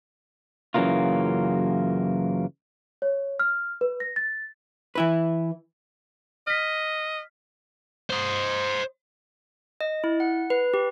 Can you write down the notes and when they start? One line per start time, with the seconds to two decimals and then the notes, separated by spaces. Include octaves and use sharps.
0.74 F#2 C#3 E3 F#3 A#3 F4
3.02 C#5
3.39 F6
3.81 B4
4.00 A#6
4.16 A6
4.95 E3 E4 B4
6.47 D#5 F6 B6
8.10 C5 D#5
9.81 D#5
10.04 E4
10.20 F#5
10.50 B4
10.74 G4